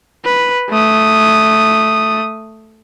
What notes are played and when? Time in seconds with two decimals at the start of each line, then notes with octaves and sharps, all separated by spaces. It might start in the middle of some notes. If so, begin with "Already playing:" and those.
0.25 B4
0.69 A3 D#6